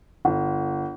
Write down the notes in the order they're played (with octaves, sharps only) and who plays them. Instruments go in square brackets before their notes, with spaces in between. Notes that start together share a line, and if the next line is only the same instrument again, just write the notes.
[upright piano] G1